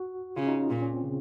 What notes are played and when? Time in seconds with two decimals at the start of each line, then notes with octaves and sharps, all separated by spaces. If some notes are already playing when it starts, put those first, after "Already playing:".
Already playing: F#4
0.36 C#3 F4
0.47 D#4
0.59 C#4
0.70 A#2 F4
0.82 C#4
0.93 C4
1.04 C#3